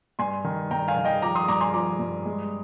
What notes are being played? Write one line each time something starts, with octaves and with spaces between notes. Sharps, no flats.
G2 G#5 C6
D#3
G2 G5 A#5
F5 G#5
D#3
D#5 G5
F3 A#5 D6
C6 D#6
G2 A#5 D6
G#5 C6
F3 A#5 D6
G2
G#3